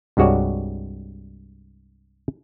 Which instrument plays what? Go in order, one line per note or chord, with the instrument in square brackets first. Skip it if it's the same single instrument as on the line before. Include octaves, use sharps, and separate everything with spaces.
[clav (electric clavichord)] C2 G2 G#3 F#4 C#5 D5